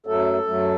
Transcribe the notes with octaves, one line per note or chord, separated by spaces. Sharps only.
F#2 F#3 A3 A4
F#2 F#3 A3